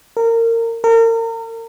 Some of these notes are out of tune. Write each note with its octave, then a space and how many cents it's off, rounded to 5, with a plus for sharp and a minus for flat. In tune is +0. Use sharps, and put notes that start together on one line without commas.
A#4 -25
A#4 -35